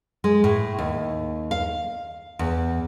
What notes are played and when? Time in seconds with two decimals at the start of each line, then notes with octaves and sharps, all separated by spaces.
0.24 G#3
0.44 A2
0.79 D#2
1.51 F5
2.39 E2